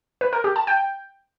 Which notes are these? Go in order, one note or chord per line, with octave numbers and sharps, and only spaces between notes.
B4
A#4
G4
A5
G5